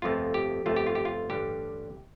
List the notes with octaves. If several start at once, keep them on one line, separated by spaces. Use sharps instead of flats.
G1 F2 F3 A3 F4
G4
G1 F2 F3 A3 F4
G4
F4
G4
F4
A1 G2 D3 G3 G4